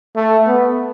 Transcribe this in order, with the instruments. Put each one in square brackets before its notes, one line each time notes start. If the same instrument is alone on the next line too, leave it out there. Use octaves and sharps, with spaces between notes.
[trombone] A3
B3